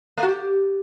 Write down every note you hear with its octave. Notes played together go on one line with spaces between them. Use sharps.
A3
F#4
G4